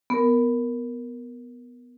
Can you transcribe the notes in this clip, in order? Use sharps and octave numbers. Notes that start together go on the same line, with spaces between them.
B3 A#4